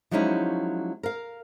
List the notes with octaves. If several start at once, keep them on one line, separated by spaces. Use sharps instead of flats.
F3 F#3 G#3 C#4 D#4 E4
A#4 F5